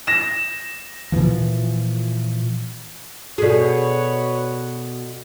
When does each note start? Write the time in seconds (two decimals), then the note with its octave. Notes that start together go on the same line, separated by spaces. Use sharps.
0.07 A#6 E7
1.12 A#2 C#3 E3 F3
3.38 B2 F#4 G#4 A4 B4 C#5 D5